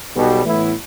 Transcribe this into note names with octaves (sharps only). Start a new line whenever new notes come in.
B1 B2 G3
A2 E3 B3 E4